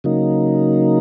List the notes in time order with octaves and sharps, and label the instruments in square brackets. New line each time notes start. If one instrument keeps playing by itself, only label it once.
[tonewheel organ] C#3 F#3 A#3 D#4